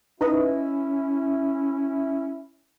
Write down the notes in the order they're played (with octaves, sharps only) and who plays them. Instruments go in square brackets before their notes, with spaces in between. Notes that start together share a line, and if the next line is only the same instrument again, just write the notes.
[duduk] C#4 [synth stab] D#4 B4 D#5 [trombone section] E4